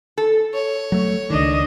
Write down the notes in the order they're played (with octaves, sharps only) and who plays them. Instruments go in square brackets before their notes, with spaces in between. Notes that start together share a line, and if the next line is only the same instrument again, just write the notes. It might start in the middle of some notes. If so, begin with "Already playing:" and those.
[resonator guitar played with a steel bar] A4
[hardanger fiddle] C#5
[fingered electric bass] F#3 A3
[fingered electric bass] C#2 D#3 [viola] D4 D#5